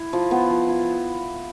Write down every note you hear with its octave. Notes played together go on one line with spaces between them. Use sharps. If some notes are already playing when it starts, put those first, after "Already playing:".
Already playing: E4
F3
B3
F3
E4